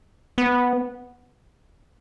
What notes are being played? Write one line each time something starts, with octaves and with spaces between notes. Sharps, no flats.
B3